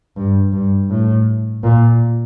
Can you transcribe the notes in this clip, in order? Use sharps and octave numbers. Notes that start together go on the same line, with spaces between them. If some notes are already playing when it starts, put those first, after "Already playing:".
G2
G2
A2
A#2